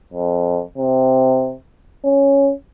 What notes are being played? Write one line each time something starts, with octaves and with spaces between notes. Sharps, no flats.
F2
C3
C#4